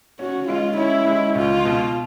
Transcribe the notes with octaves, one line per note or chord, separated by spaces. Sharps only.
C#4 F#4
G#3 F4
C#4 E4
G#3
C#2 F4
B2